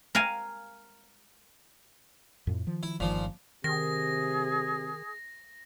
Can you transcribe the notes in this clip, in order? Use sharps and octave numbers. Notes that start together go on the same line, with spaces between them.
A#4 F5 G#5
F2 A2
D#3 F3
E4
G1 A#2 D#3 F3
C3 D#3 G#4 A#6